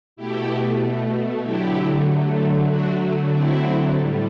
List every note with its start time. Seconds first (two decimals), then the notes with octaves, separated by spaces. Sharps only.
0.16 B2 A3 E4 G4
1.43 D3 F#3 A3 E4 G4
2.69 D3 F#3 A3 D4 F#4
3.33 C4 E4
3.96 A2 G3